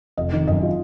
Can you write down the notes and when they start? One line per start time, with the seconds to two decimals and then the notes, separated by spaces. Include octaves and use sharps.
0.17 F1 D#5
0.33 D#3
0.48 F#2 D#5
0.63 F4